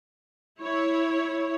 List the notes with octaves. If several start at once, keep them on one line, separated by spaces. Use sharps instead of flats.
E4 C#5